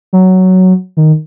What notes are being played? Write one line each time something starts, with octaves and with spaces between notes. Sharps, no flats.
F#3
D#3